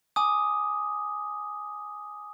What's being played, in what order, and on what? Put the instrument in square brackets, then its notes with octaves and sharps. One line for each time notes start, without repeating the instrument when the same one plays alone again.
[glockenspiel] G#5 D6 D#6